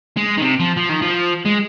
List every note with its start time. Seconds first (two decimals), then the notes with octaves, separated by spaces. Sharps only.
0.17 G#3
0.38 D#3
0.42 C3
0.60 F3
0.77 F3
0.89 D#3
1.02 F3
1.45 G#3